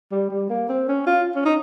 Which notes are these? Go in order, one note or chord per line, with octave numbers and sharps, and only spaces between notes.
G3
G3
A#3
C4
C#4
F4
C#4
D#4